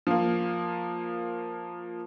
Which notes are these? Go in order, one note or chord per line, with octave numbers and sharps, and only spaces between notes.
F3 A#3